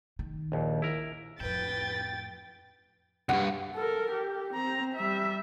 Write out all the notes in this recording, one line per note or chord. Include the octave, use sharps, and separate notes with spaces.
D#3
A#1 D#2
E4 A#4
F2 A2 B4 G5 A6
C2 G2 F#5
A4 A#4
G4
C4 A#5
G3 E5